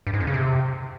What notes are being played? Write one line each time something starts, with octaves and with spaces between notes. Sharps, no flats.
G2
G#2
F2
C#3
C3